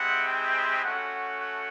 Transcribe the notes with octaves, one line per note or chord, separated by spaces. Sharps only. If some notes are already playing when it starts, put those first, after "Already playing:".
Already playing: G#3 C4 E4 G4 F#5
G5
A3 C#4 F#4 F#5
F#5